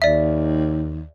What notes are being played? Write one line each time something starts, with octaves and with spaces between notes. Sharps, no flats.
D#2 D5 E5